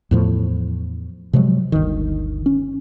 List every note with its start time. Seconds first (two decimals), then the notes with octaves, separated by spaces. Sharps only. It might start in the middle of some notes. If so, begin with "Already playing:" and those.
0.11 E2 A2 F3
1.33 C3 F3 F#3 G#3
1.72 G1 D2 D#3
2.46 C#4